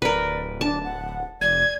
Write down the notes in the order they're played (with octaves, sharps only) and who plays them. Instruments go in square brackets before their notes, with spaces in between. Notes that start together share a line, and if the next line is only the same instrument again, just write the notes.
[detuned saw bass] D1 [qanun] A#4 B4 [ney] D5
[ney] D4 [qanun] A5
[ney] F#5
[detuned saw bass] F1 [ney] D5 [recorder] G#6